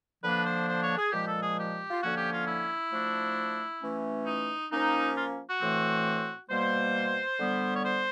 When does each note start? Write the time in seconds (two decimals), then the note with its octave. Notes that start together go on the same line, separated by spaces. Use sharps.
0.23 D3 F3 A#3 D4 B4
0.45 C5
0.68 C5
0.83 C#5
0.98 G#4
1.12 A#2 F3 G#3 G4
1.27 A4
1.43 G#4
1.57 G4
1.91 F4
2.02 D3 F3 A#3 C#4 F#4
2.17 G4
2.32 F4
2.47 E4
2.92 F3 A3 D4
3.81 E3 A3 C#4
4.26 D#4
4.71 F3 A#3 C#4 D#4
5.15 F4
5.49 F#4
5.60 A2 E3 A3 C4
6.50 B2 G3 A#3 C5
7.39 D3 G3 B3
7.75 C#5
7.84 C5